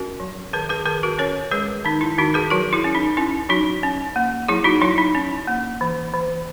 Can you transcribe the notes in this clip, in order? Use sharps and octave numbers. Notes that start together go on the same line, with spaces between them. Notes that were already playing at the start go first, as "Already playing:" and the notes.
Already playing: C#4 F#4 A#4
F#3
D#3 G#4 B4
G#4 B4
D#3 G#4 B4
F#4 A#4
C#4 A#4 C#5
G#3 G#4 B4
D#3 D#4
E4
D#3 D#4 F#4
G#4 B4
F#3 F#4 A#4
E4 G#4
C#4
D#4
C#4 E4
F#3 D#4 F#4
C#4
A#3
F#3 E4 G#4
D#4 F#4
F#3 E4
D#4
C#4
A#3
E3
E3